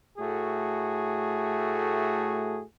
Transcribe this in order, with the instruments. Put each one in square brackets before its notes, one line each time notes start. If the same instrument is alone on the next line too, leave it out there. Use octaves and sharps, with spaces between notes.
[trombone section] A2 A3 F#4 G#4